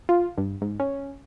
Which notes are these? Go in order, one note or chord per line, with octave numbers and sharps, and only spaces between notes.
F4
G2
G#2
C#4